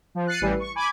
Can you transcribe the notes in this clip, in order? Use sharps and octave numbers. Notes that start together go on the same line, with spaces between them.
F3
F#6 A6 C7 C#7 D#7
A1 E3 G3
C#6
G#5 B5 D6 G#6